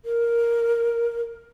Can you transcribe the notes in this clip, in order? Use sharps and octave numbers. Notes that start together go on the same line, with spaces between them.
A#4